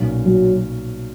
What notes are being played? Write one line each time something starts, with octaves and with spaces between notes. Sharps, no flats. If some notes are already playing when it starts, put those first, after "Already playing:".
Already playing: B1 A#2 F#3 C#4 F#4
F#3